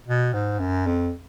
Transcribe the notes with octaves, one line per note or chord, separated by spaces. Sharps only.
B2
G#2
F#2
F2